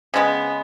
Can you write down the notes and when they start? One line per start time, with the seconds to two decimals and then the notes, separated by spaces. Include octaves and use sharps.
0.14 C#3 G#3 B3